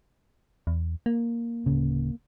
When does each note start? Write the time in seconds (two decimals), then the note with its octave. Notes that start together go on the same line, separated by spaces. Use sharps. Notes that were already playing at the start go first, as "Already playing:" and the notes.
0.67 E2
1.06 A#3
1.66 D1 C#3